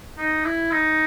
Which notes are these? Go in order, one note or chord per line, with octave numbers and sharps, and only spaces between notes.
D#4
E4
D#4